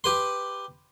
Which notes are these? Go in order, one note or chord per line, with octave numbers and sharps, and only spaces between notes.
G4 B4 C6